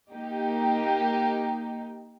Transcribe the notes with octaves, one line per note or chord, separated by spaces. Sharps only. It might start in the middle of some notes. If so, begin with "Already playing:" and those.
A#3 D#4 G4